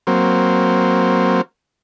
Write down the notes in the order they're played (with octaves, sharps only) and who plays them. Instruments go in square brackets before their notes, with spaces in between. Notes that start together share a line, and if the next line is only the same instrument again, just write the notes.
[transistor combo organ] F#3 A#3 C4